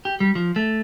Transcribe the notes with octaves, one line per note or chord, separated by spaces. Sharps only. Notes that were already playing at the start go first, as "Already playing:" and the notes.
G4
G3
F3
A3